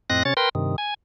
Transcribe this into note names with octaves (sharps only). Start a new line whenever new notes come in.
F2 A2 C4 D#5 F#6 A#6
C3 C#4 C#5 A6
A#4 B4 G5 C6
G2 C3 D#3
G#5